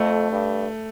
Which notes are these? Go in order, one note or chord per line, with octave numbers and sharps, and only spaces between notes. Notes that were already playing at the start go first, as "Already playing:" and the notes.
Already playing: F2 A3
G2